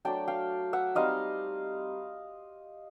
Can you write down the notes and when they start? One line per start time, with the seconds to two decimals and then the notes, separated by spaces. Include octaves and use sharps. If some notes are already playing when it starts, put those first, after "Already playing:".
0.05 F#3 A3 D4 G5 A5
0.28 F5 G5
0.73 E5 F#5
0.95 G3 C4 D#4 D#5 F5